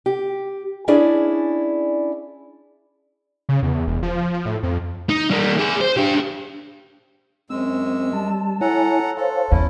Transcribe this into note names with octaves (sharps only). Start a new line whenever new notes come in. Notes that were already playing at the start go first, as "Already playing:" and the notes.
G4
C#4 D4 E4 G#4 D5
C#3
E2
E1
F3
A2
F2
D#4
G3 A#3
G#4 D5
C5
D4 G4
F#2 G#3 C4 E6
G3 A5
E4 A4 C#5 F#5 G#5 A#5
A4 C5 C#5 F5
E2 C#4 E4